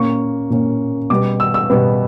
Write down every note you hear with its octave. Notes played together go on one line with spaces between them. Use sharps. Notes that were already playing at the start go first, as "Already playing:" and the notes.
Already playing: A#2 A#3 C#4 C#6
A#2 A#3 C#4
B2 G3 B3 D6
E6
E6
B2 G3 B3